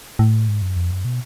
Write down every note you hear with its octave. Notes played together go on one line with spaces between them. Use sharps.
A2
G#2
F#2
F2
F#2
B2